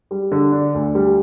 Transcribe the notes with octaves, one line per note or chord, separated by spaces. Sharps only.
G3
D3
D4
D2
G3